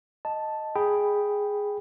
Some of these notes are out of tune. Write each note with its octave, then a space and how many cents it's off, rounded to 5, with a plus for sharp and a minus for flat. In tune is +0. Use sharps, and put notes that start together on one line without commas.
D#5 +0 A5 +0
G#4 +0 G5 +0 B5 +0